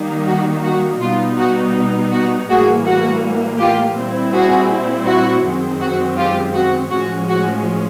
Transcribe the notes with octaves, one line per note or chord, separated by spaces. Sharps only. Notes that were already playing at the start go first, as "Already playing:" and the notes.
Already playing: D#3 G3 A#3 D#4
F#4
F#4
B2 G3 B3 D#4 F4
F#4
F#4
A2 E3 G3 A#3 F#4 G#4
F#4
F4 G4
A#2 G3 C4 E4
F#4 G#4
F#4
F#2 D#3 G#3 C4
F#4
F4 G4
F#4
A2 F3 G#3 C#4 F#4
F#4